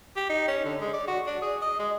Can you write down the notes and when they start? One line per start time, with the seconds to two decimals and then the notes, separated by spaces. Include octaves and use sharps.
0.16 G4
0.29 D#4
0.48 C#4
0.65 D3
0.80 G#3
0.93 D5
1.07 F#4
1.26 D4
1.42 G#4
1.62 D#5
1.79 G#3